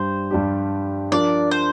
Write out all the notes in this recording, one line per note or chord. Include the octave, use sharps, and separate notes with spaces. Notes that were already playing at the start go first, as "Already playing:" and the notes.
Already playing: G2 G3 D4 G4 C5
G2 G3 D4 G4
F3 D4 A#4 D5
C5